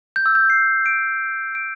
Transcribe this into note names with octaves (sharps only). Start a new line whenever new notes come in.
G6
E6
G6
C7
D7
D7